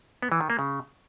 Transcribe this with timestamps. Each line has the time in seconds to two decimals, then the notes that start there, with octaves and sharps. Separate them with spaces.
0.22 B3
0.32 E3
0.41 D#3
0.50 A#3
0.59 C#3